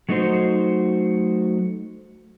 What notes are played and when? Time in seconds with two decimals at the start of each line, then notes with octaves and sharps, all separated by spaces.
0.09 F#3 A3 D#4 F#4 C5